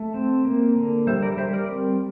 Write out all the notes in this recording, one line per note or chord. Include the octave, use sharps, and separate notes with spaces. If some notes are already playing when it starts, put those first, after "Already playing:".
Already playing: A3
C4
A#3
D3
G3 C5 E5
A#4 D5
G3 C5 E5
A#4 D5
C4